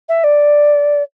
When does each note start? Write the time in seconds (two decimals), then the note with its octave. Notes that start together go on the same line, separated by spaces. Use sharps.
0.09 E5
0.24 D5